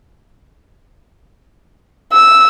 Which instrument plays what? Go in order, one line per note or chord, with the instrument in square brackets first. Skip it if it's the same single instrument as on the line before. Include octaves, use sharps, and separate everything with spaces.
[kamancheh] E6